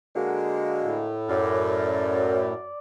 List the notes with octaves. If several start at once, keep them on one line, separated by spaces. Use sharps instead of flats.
D3 G#3 A#3 F#4
A2
F#2 D5